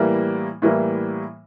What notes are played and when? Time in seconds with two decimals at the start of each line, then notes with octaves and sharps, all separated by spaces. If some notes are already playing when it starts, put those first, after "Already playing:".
Already playing: A2 E3 G3 A#3
0.62 A2 E3 G3 A#3